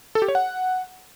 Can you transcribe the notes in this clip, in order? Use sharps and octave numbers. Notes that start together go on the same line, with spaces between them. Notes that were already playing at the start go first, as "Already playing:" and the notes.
A4
G4
C#5
F#5